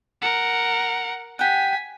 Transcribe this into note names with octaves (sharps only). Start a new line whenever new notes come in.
A#4 F#5
G4 F#5 G#5 B6